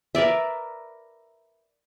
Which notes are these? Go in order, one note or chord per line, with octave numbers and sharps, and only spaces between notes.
A#4 B4 D5 E5